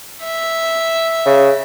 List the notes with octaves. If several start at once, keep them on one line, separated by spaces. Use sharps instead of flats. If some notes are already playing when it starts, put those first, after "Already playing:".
E5
C#3